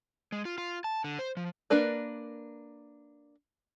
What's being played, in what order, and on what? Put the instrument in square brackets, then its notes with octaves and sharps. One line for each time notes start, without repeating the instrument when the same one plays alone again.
[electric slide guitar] G#3
F4
F4
A5
D3
C5
F3
[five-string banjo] A#3 D4 A#4 B4 D5